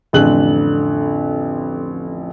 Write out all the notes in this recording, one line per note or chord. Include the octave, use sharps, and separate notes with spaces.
A1 F2 D3 F#6 F#7